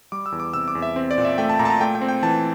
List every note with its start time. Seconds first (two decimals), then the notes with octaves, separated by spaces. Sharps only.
0.12 G3 D6
0.26 E6
0.32 E2
0.40 D6
0.54 C3 E6
0.68 D6
0.75 E2
0.82 E5
0.96 C4
1.11 D5
1.18 A#2
1.25 E5
1.38 A3 G5
1.50 A5
1.59 A#2 A#5
1.65 A5
1.70 A#5
1.80 A3 G5
1.95 G5
2.01 C4
2.08 G5
2.23 E3 A5